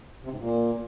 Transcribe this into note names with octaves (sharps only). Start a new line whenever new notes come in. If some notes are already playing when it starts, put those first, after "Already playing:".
C3
G#2
A#2